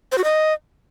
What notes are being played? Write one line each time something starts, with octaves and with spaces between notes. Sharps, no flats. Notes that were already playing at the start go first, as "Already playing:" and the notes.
C5
F#4
D#5